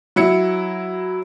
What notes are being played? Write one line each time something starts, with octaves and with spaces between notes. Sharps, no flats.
F#3 E4 C#7